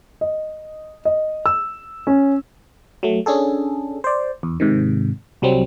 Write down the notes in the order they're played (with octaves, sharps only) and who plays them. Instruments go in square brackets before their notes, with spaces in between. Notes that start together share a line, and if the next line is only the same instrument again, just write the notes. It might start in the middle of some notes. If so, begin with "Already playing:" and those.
[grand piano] D#5
D#5
E6
C#4
[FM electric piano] F#3 A3
C#4 D4 G#4 A4
C5 D5
E2
G#2 C3 D#3
C2 F#3 G3 C4